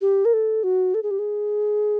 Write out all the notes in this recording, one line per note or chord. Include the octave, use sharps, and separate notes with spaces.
G4
A#4
A4
F#4
A4
G#4
G4
G#4